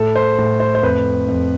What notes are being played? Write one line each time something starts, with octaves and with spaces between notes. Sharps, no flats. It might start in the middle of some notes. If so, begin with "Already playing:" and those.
Already playing: A2 A4
C5
A2
C5
C5
F2 B4
F2